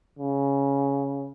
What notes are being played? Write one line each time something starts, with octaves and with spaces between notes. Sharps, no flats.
C#3